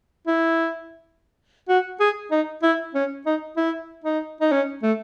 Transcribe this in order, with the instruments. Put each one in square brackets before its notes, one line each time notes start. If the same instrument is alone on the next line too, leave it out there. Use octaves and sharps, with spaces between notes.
[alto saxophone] E4
F#4
G#4
D#4
E4
C#4
D#4
E4
D#4
D#4
C#4
A3